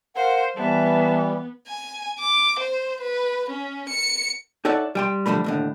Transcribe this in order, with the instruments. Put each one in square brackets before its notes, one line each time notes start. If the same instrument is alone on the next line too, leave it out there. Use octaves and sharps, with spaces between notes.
[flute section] A#4 F5 F#5 [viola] C5
[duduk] E3 [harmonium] G3 [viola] B3 [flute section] E5 A5
[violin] G#5
D6
C5
B4
C#4
C#7
[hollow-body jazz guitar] D#4 A4 C#5 D5 E5 F#5
G3 G5 C6
D3 F3 G3 A3 B5
D#2 A2 D3